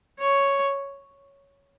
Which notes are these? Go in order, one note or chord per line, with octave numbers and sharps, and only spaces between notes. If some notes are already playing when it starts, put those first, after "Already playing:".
C#5